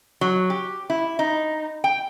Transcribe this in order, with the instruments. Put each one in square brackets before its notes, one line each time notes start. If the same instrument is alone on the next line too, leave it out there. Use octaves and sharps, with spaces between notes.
[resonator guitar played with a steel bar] F#3
G4
E4
D#4
G5